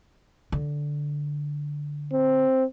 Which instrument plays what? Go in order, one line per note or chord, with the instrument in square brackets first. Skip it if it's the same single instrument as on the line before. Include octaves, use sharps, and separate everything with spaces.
[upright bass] D3
[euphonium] C4